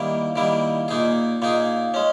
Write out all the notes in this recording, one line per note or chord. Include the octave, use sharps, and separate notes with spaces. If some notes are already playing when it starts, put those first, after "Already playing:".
Already playing: D#3 G3 A#3 E4
D#3 G3 A#3 E4
A#2 A#3 D#4 G#4
A#2 A#3 D#4 G#4
G#3 C#4